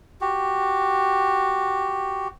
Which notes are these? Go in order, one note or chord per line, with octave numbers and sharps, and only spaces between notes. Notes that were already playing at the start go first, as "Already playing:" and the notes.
F#4 G4